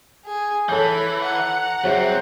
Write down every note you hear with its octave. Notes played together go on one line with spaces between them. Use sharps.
G#4
E3 A4 C#5 B5 G6
F#5 A#5
C2 F#3 C4 G#4 C5 E5